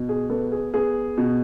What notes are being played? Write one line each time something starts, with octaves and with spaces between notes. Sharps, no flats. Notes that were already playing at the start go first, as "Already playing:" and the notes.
Already playing: B2
G#4
B3 A4
G#4
B3 G#4
B2